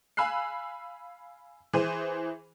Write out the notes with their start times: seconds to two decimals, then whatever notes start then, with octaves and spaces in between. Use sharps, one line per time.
0.17 F5 G#5 B5 E6 F#6 C7
1.73 E3 G#4 C5 D#7